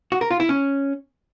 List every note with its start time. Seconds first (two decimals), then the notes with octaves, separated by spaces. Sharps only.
0.12 F#4
0.21 A#4
0.30 F4
0.40 E4
0.49 C#4